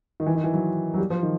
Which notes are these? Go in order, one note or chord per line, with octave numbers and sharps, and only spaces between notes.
D#3
E3
D#3
E3
F#3
F#3
G3
F3
D#3